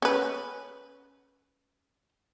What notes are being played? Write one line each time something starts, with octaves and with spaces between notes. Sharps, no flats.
C#4 B4